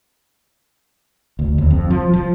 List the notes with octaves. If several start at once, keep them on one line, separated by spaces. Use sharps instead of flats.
D2
D#2
F2
F3
F3